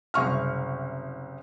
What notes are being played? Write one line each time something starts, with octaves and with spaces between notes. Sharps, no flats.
F#1 C2 C#6 F6